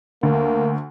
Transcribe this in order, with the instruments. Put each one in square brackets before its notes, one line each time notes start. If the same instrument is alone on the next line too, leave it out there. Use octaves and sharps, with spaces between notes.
[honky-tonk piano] D2 [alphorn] A#3